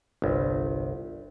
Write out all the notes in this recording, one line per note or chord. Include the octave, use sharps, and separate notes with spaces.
G1 C2